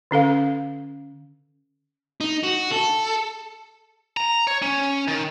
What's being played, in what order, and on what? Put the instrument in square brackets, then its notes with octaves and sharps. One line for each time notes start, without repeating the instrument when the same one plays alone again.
[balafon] D3 C#4 A4 F5
[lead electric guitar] D#4
F#4
A4
[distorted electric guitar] A#5
C#5
C#4
D#3